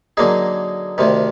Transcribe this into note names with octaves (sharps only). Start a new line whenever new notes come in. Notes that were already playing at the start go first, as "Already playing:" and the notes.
D3 F#3 A#3 D#4 G#4
D2 C3 D#3